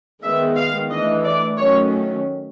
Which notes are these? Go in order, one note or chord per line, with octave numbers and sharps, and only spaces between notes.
D#3 G#3 B3 E5
F5
E3 A3 D4 D#5
D5
D#3 F#3 A3 C#4 C#5